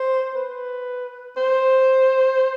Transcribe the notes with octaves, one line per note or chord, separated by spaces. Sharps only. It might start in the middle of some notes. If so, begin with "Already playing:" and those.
Already playing: C5
B4
C5